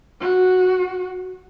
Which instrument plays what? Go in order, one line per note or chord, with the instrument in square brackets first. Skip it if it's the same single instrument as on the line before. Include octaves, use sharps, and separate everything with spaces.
[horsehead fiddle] F#4